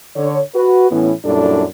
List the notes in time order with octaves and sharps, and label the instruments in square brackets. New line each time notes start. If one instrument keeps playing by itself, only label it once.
[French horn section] D3 C#5
F#4 B4
A2 E3 B3 C#4 E4
F#2 A#2 G3 D4 E4 A4